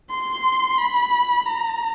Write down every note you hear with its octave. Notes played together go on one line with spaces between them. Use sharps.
C6
B5
A#5